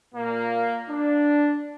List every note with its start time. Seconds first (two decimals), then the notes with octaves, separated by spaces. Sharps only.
0.14 A#2 A#3
0.89 D4